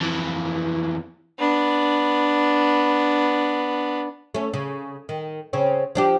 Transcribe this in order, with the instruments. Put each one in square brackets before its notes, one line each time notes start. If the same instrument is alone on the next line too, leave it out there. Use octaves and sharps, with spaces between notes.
[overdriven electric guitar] F2 E3
[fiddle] B3 D4
[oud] A3 C#4
C#3
D#3
C#3 C4 C#4
F3 D4 G4